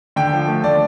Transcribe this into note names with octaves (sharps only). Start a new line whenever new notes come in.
D3 G5
F3
A3
D3 D5